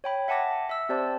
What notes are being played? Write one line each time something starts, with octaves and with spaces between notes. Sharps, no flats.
C#5 G5 B5
E5 F#5 G#5 A5 D6 A#6
E5 E6
C4 G4 C5 D5 A5